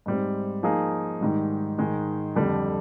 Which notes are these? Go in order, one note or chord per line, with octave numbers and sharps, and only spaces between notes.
G#2 G3 C4
F3 A#3 D#4 G#4
G#2 D#3 G3
G#2 D#3 G#3
F2 D3 G3